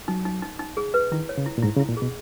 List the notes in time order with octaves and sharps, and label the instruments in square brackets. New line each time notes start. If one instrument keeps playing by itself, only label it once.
[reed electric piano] F#3 [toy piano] D#4
[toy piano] D#4
D#4
D#4
G#4
B4
[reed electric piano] D#3 [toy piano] E4
[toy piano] C#5
[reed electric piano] C#3
[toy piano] E4
[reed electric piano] A#2
[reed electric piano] G#2 [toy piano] E4
[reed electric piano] C#3
[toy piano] E4
[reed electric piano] A#2
[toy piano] G#4
[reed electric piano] B2